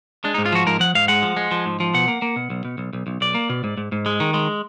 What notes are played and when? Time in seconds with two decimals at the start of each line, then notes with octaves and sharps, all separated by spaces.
0.24 G#3 D4
0.34 D#4
0.38 G#2
0.46 F4
0.52 F3 F#4
0.67 G#2 A#4
0.80 F3 F#5
0.95 G#2 F5
1.08 G#3 F#5
1.23 F3
1.37 G#3
1.51 F3
1.66 G#2
1.80 F3
1.94 B2 F#5
2.08 A#3
2.22 A#3
2.36 B2
2.50 B1
2.65 B2
2.78 B1
2.93 B1
3.07 B1
3.21 B1 D5
3.35 A#3
3.49 B2
3.64 G#2
3.77 G#2
3.92 G#2
4.06 G#3
4.20 D#3
4.34 G#3